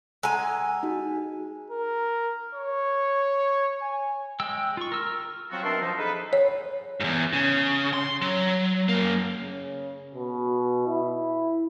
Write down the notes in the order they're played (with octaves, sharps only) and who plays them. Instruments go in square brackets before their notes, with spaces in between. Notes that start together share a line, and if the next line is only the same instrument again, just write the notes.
[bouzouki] G#3 G#5 [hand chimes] F#5 A#5 E6
[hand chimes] D#4 F#4
[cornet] A#4
C#5
G#5
[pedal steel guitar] G#3 G5 E6
F4 C#6
A#4 E6 F6
[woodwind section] F3 F#3 C4 F4 F#4
B2 D4 A#4 E5 A5 C6
F3 D#4
D#4 G#4 A4 B4
[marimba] C#5
[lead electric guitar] E2 G#2
C#3
C6
F#3
F#2 A#3
[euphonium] C#3
B2
E4